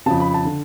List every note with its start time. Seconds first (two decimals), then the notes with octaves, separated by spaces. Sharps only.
0.06 F2 C#3 A5
0.20 B5
0.34 A5
0.45 D3